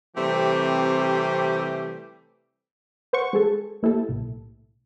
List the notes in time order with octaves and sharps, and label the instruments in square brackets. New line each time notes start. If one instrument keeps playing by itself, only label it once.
[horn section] C3 E3 G3 A3 C4 G4
[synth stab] B4 C5 F#5 C#6
G#3 G#4 A4
A#3 E4 G4 A4
B1 A2